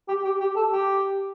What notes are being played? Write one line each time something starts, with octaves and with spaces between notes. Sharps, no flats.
G4
G4
G4
A4
G4